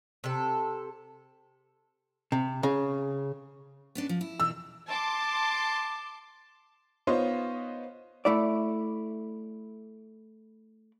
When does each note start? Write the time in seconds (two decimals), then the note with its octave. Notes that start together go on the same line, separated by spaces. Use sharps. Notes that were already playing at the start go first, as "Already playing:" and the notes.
0.24 C3 A4
2.32 C3
2.63 C#3
3.95 B3 C#4 D4
4.09 F3
4.21 E4
4.40 B2 D#3 E3 E6
4.89 A5 C6 D6
7.07 B3 D#4 F4 C5 C#5 D#5
8.25 A3 E4 D5